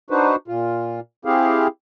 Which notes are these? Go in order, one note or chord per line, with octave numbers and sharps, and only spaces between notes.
D4 D#4 F#4 B4 C5
A#2 F4
C4 E4 G4 G#4 F5